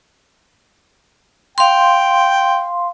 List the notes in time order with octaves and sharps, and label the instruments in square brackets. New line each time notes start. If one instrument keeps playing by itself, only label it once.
[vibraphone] F5 C6 [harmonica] G5